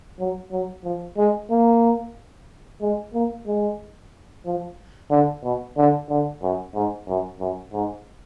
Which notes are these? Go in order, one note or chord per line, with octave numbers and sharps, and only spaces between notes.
F#3
F#3
F3
G#3
A#3
G#3
A#3
G#3
F3
D3
B2
D3
D3
F#2
G#2
F#2
F#2
G#2